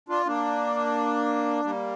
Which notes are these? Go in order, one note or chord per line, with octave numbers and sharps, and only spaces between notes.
D4 F4
A#3 D4
G3 A#3